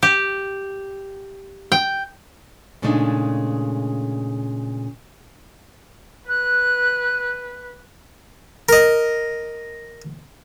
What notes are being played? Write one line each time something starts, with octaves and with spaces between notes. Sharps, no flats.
G4
G5
A#2 C#3 G#3 A3 D4 D#4
B4 F#6
A#4 D#5